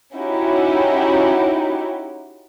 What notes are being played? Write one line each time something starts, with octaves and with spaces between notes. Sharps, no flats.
C#4 D#4 E4 F#4 G4